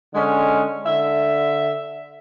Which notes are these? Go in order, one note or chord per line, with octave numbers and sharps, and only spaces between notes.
D3 G#3 C#4
D3 E5